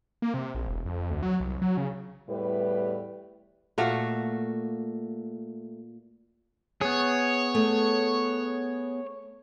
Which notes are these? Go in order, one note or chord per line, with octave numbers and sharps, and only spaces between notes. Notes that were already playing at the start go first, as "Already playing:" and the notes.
A#3
C3
A#1
E1
F2
D2
F#3
C2
F#3
C#3
E2 A2 G3 B4
A#2 A3 F#4 F5
B3 G#4 C#5
A3